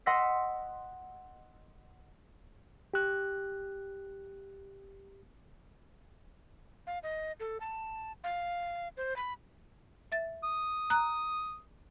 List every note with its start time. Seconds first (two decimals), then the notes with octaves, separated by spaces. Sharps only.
0.06 D#5 F#5 C6 E6 A#6 B6
2.94 G4 F#6
6.87 F5
7.03 D#5
7.40 A4
7.60 A5
8.24 F5
8.97 C5
9.16 B5
10.12 E5 A6
10.44 D#6
10.90 A#5 F#6